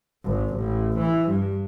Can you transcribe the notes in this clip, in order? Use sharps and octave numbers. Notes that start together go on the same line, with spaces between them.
G#1
A1
E3
G2